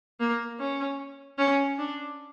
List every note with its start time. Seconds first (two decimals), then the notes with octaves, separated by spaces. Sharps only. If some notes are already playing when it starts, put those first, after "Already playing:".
0.20 A#3
0.59 C#4
1.38 C#4
1.78 D4